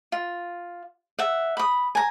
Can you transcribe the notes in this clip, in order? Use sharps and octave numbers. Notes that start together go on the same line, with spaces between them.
F4
E5 F#5
B5 D#6
G#5 A#5